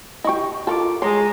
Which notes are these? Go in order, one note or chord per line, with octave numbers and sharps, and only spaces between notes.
E4 G4 D#5 C#6
F4 A4 A#4 D6
G#3 G#4 C#5 A#5 C6